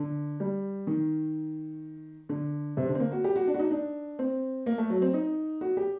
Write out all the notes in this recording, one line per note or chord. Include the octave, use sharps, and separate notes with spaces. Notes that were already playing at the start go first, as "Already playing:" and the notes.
Already playing: D3
G3
D#3
D3
C3
D3
C4
A#3
F#4
G4
F#4
D4
F#4
D#4
D4
C4
A#3
A3
F#3
C4
D#4
F#4
G4